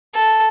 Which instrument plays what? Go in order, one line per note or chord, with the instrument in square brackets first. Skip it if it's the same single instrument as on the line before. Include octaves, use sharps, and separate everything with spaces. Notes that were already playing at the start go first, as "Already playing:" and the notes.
[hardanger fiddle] A4